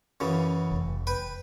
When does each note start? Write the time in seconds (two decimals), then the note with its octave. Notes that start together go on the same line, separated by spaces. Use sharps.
0.20 F#2 C#3 E3
0.72 F1
1.07 B4 G5